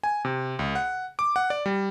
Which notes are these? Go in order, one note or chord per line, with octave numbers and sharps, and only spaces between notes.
G#5
C3
C#2
F#5
D6
F#5
D5
G3